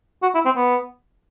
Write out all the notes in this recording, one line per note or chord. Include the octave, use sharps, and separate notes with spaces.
F#4
E4
C4
B3